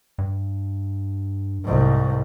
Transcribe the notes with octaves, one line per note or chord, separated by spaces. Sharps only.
G2
C2 G#2